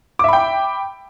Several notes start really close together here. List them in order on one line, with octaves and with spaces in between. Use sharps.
D6 E5 B5 G5